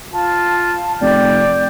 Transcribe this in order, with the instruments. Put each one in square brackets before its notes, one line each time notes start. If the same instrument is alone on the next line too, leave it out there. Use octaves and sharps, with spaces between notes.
[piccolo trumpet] F4 [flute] A5
[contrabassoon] F1 [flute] D5 [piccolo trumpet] G5